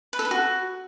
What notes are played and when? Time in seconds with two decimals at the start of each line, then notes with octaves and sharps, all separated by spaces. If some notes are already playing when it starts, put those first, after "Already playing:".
0.13 B4
0.19 A4
0.25 B4
0.31 F#4